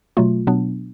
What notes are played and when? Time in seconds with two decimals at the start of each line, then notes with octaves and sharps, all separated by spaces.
0.17 B2 F#3 A3 F4
0.47 B2 F#3 B3 D4